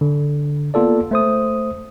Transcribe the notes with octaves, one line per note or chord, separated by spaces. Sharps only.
D3
A#3 B3 F4 A4 D5
A3 C5 D#6